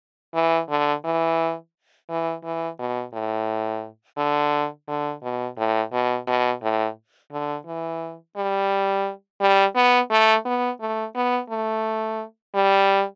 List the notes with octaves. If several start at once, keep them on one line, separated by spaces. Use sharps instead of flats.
E3
D3
E3
E3
E3
B2
A2
D3
D3
B2
A2
B2
B2
A2
D3
E3
G3
G3
B3
A3
B3
A3
B3
A3
G3